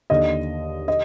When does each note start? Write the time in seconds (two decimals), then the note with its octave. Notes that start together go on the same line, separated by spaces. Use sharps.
0.10 D#2 D3 D#5
0.88 D#5